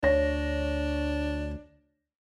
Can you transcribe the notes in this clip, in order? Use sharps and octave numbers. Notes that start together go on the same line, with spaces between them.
D2 D4 C#5 A#6